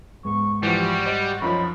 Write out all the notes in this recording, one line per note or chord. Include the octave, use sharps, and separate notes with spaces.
G#2 G#3 B3 C#6
E3 F3 G3 F#4
C5 D5 D#5
F#2 F3 D#4 F4 C#5 B5